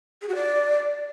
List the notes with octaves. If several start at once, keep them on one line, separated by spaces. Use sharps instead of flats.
G#4
F#4
D5